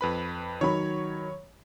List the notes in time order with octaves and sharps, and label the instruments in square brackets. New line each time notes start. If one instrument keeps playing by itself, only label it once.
[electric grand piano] F2 B4 B5
[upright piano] D#3 F#3 B5 [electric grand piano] C#5